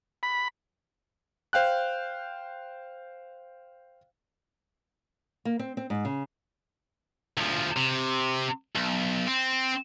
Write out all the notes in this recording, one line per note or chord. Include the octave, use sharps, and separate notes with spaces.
B5
C5 F5 G5 F#6
A#3
C4
C4
G#2
C#3
D2 F3
C3
B1
C4